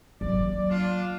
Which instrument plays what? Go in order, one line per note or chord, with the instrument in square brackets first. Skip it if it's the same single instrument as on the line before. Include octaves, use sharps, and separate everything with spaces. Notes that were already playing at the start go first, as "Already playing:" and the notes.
[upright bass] F#3 A#3 [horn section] D5
[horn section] D4 F4